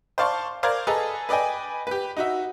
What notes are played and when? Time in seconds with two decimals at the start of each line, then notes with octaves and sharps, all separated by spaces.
0.18 C5 D5 F5 A5 C6 C#6
0.63 A#4 C5 D5 F5 A#5 G#6
0.87 G#4 A4 B4 D#5 A#5
1.29 B4 D5 D#5 G5 G#5
1.87 G4 B4
2.17 D#4 F#4 E5